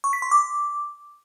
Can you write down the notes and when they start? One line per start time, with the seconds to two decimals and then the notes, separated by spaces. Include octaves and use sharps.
0.04 C#6
0.13 B6
0.22 C6
0.31 D6